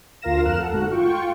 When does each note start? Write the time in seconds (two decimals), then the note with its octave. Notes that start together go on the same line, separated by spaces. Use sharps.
0.22 D2 F4 A#4 F5 A#6 E7
0.45 F2 A#4 F6 F#6 E7
0.59 A4 F#5
0.73 G1 G#2 A3 F#4 F#6
0.92 F4 G5 C#6